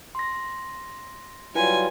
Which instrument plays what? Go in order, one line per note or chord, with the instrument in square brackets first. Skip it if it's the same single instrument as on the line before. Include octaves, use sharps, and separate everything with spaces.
[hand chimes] C6 A#6
[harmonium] F#3 G3 F4 [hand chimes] E4 B4 [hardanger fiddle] G#5